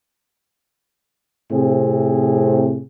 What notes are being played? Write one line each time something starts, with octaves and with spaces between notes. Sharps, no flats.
A2 C3 C4 G#4